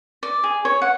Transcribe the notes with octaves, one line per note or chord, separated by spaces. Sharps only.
D5
G#4
C#5
F#5